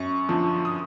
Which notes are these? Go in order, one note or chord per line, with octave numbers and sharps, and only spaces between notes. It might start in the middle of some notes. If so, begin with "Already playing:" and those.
Already playing: F#2 C#6
D3 F3
D#6